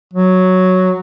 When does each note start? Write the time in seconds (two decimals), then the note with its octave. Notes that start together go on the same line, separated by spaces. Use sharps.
0.13 F#3